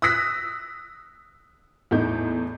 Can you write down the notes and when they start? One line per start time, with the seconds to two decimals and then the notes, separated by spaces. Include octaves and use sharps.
0.02 D#6 E6 F#6 A#6 B6
1.91 E2 A2 D#4 G6